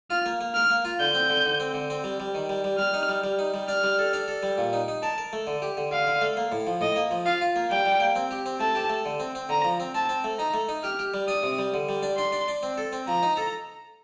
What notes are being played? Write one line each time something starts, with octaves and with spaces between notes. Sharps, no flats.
F4 F6
A#3
A#3
A#4 F6
A#3
F4
D3 G6
C4
D3
D3
C4
D3
C4
G3
G3
D#3
G3
G3
G3 F6
D#4
G3
G3
D#4
G3
D4 F6
G3
A4
D4
A4
G3
A#2
D#4
D#4
A#4 A5
A#4
A3
D3
G4
D3
D3 F5
D3
A3
A#3
A2
F3
A2 D#5
A#3
F3
F4 F5
F4
A#3
G3 G5
G3
A#3
C4
G4
C4
A3 A5
G4
A3
D3
C4
C4
D3 A#5
F3
C4
C4 A5
C4
A3
D#4 A#5
A3
D#4
G4 F6
G4
G3
D4 D#6
C3
G3
D3
G3
D4
D4 C6
D4
D4
C4
A4
C4
F3 A#5
D#4
A4